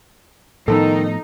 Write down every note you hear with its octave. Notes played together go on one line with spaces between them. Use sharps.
A2 D#3 F3 B3 D#4 A4